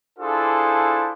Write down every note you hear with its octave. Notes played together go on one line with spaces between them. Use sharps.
D4 E4 F4 G#4 A4 C5